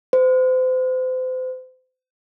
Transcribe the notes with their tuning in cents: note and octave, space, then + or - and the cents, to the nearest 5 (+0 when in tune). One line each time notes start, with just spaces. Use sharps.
C5 -35